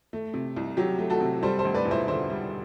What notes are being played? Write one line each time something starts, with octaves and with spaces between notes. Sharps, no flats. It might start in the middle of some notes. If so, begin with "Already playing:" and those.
A3
C3
C2
F#3 G4
A3
F#4 A4
C3
G3 A4 C5
A4 C5
D2
B4 D5
E1
C5 E5
D3 C5 E5
G3